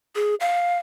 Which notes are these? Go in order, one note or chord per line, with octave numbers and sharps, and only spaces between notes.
G#4
F5